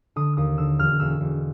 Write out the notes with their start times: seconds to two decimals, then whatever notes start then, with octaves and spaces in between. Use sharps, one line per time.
0.16 D3 D#6
0.37 D#2 D#6
0.58 D3 E6
0.79 E1 F6
1.00 E1 E6
1.20 E1